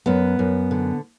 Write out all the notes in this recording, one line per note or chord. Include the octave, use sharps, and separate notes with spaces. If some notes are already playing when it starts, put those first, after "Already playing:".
F#2 B3
F#2
D3